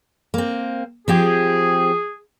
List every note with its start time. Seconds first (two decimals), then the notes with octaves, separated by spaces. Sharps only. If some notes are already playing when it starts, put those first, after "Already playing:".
0.34 A#3 C4
1.08 F3 C4 G4 G#4